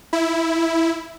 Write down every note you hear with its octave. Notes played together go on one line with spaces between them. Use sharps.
E4